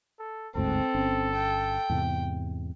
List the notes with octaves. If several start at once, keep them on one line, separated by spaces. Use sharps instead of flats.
A4
G1 D2 G#2 C4 A4
G1 C#4
G5
E2 G#2 C3